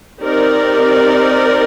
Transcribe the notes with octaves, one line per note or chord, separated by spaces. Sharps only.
C4 D#4 G4 A#4 D5